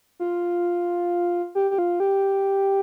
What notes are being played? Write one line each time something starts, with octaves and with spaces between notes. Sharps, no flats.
F4
G4
G4
F4
G4